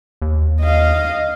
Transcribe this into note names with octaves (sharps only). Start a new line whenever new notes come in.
D#2
D#5 F5